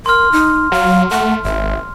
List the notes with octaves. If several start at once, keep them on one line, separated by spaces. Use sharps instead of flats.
A#4 C6 F6
D#4
F#3 F5
A3 F#5
G#1 E5